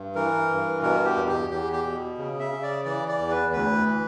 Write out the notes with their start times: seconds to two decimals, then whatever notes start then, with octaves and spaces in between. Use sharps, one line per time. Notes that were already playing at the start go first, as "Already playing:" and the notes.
Already playing: G2
0.15 E3 A#4
0.50 G2
0.83 B2 A#4
1.05 G4
1.16 E2
1.28 G4
1.50 E2 G4
1.73 G4
1.84 B2
2.18 C#3
2.40 E5
2.51 C#3
2.63 D5
2.85 E3 D5
3.08 D5
3.18 E2
3.30 B4
3.52 D2 B4
3.87 E3